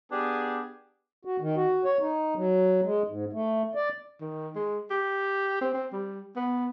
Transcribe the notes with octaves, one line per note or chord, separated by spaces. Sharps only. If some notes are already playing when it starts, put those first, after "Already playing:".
B3 D4 G4 G#4
F#4
D#3
F#4
C#5
D#4
F#3
G#3
G#2
A3
D5
D#3
G#3
G4
C4
C4
G3
B3